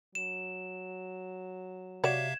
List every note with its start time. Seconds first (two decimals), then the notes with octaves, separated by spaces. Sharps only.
0.15 F#3 E7
2.04 C3 F#4 C#5 D5 E5 F5 G#6 E7